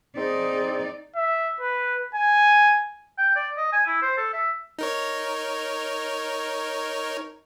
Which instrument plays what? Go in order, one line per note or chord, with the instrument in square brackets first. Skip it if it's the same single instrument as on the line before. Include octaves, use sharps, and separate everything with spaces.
[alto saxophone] C4 [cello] D#4 D5 [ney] G#4
[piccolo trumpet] E5
B4
G#5
[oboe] G5
D5
D#5
G#5
E4
C5
A4
E5
[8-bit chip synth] D#4 A#4 C#5